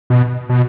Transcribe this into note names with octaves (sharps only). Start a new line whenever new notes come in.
B2
B2